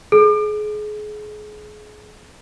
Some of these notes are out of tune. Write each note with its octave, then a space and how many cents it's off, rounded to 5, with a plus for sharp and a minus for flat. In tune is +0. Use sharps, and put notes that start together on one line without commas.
G#4 +30